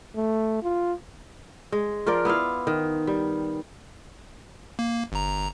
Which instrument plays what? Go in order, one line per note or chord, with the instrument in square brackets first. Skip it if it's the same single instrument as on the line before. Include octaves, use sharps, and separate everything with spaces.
[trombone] A3
F4
[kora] G#3
F3 F4 A#4 D5
B3 E4 F4 F5
D#3
G3
[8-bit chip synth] A#3
G1 A#5